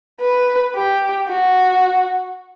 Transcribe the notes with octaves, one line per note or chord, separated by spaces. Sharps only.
B4
G4
F#4